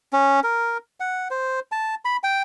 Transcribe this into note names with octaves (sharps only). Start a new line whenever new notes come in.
C#4
A#4
F#5
C5
A5
B5
G5